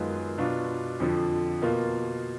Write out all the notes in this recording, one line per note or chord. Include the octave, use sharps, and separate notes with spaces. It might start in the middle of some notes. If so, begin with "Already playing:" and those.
Already playing: F#2 D#3 G#3 B3 F4
B2 F#3 B3 D4 F4
F2 D3 F3
B2 A#3 F4